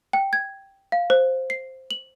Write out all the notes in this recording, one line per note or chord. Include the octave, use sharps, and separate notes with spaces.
G5
G#6
F5
C5
C7
F#7